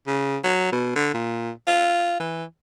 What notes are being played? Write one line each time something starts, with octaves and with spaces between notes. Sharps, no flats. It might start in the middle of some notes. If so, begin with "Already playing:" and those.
C#3
F#3
B2
D3
A#2
F4
E3